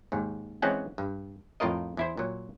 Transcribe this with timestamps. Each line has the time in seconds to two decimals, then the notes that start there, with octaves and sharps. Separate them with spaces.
0.12 D#2 G#2
0.62 E3 G#3 C4 C#4 F#5 G5
0.98 G2
1.60 F2 A2 F4 A#4 D#5
1.97 E2 E4 C5
2.17 A#2 F#3